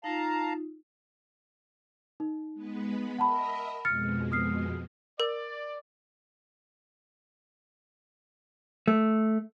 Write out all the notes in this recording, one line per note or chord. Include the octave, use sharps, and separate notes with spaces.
D#4 F4 F5 A5 A#5
D#4
G#3 B3 B4
A#4 D#5 E5 F#5 A5 B5
F2 B2 G#3 F6 A6 C#7
D#6 F6 C7
A#4 D5
A3